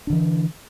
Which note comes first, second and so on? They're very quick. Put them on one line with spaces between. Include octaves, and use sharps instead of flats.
D4 D3 E3